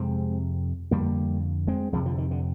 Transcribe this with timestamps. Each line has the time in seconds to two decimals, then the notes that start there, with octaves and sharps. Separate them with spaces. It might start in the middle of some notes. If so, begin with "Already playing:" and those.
Already playing: F2 C3 G#3 C4
0.91 F2 D3 G3 A#3
1.67 G#3 C4
1.92 F2 C3 F3 G#3
2.05 D3 F3
2.18 D#3
2.31 D3